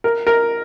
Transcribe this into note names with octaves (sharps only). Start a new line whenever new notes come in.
A#4
A#4